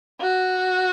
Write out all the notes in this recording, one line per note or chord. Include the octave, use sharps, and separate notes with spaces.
F#4